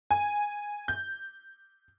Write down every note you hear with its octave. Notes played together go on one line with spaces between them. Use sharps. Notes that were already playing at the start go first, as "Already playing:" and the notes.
G#5
G6